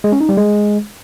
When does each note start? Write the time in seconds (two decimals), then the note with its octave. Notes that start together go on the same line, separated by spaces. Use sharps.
0.04 G#3
0.12 C#4
0.21 D#4
0.29 G3
0.37 G#3